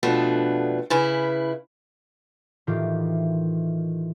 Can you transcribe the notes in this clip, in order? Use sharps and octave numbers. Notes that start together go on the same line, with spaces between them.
F2 B2 A3 B3 D4
C#3 E4 B4
A2 D#3 E3 F4 G4